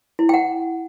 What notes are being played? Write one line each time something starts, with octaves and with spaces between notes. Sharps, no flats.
E4
G5
F#5